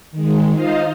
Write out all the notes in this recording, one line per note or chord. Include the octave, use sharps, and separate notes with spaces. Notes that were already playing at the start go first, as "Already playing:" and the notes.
D#3 G#3
D#4 F4 C5 D#5 F5